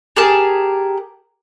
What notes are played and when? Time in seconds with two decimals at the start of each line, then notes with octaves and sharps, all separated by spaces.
0.16 G4 G#4 A#4 A5